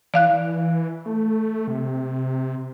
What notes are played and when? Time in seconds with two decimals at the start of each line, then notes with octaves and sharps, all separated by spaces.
0.14 E3 D5 F5 F#6
1.06 A3
1.67 C3